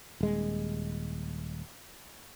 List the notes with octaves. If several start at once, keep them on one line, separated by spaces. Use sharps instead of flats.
D#1 G#3